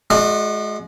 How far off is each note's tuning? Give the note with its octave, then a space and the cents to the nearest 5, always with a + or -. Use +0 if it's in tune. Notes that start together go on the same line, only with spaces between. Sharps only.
G#3 +30 F#4 -15 D#5 -45